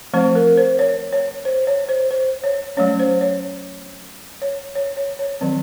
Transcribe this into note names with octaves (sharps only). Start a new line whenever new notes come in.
F3 A3 C4 C5
A#4
C5
C#5
C#5
C5
C#5
C5
C5
C#5
F#3 A3 C#4 C#5
C5
C#5
C#5
C#5
C#5
C#5
D#3 F#3 C4